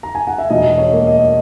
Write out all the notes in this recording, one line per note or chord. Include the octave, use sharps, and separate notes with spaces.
A#5
G#5
F#5
E5
E1 D#5
C#5
A#3
D#5